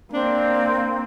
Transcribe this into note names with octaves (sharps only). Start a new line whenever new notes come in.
A#3 C4 D4